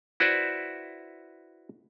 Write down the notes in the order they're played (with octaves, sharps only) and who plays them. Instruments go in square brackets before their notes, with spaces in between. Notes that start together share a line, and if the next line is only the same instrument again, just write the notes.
[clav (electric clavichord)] E4 F#4 B4 C5 D5 E5